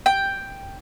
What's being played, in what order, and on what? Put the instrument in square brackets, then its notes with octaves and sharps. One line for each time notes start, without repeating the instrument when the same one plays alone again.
[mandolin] G5